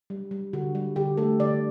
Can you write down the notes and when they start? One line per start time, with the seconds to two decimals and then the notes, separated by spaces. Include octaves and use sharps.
0.10 G3
0.31 G3
0.53 D3 F#4
0.75 G3
0.96 D3 G4
1.17 A3 A4
1.39 D3 D5